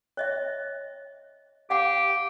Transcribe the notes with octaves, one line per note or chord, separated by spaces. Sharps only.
C#5 D#5 E5
G4 F5 F#5 D6